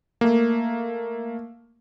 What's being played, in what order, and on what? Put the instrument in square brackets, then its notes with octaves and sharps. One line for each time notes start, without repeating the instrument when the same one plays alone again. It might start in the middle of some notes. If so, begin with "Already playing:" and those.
[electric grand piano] A3 A#3